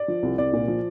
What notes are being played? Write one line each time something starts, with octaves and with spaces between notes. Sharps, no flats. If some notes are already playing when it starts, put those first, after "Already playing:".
Already playing: D5
F3
C2
C2 D5
A#2
F3